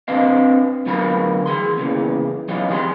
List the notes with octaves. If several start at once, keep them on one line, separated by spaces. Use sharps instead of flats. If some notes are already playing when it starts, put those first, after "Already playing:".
C4 D4 B4 C5 D#5 F5
D2 F#3 B3 F4 A#4 B5
E3 G#4 C6
E2 A#2 C#3 E3
E3 F#3 B3 C#4 D#4 F4
F2 G3 G#4 A#4 C6